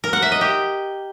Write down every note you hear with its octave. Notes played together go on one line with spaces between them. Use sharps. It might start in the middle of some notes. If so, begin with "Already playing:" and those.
A#4
F#5
E5
D#5
G4